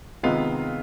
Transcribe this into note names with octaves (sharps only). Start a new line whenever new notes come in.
C3 D#3 G#3 B3 F4 F5